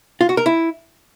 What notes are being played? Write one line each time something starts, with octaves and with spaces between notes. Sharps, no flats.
F4
F#4
A#4
E4